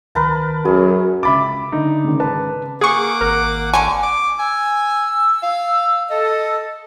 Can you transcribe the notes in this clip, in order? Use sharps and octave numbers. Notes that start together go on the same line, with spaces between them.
C#2 D#3 A#4 B4 A5
F#2 F#4 G#4
C#2 E5 B5 D6 A6
D3 D#4
G#1 C#3
B4 A5
A#3 G#4 F#5 C#6 D6
G#1 A#4
D3 G#5 C#6 D6
D6
G#5 E6
F5
A4 D#5